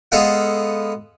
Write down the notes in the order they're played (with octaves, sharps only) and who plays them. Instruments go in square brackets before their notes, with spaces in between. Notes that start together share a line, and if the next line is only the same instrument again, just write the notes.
[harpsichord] G#3 B3 A4 F5 F#5